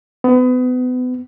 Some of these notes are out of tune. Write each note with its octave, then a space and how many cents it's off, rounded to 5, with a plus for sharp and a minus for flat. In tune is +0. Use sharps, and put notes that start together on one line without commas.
B3 +30